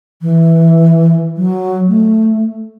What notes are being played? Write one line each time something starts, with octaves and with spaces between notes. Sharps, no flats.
E3
F#3
A3